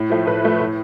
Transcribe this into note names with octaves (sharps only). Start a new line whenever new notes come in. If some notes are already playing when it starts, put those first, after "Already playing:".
Already playing: A2
F3 A3
A2 B4
F3 A3
A2